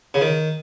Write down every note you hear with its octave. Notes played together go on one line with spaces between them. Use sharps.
C#3
D#3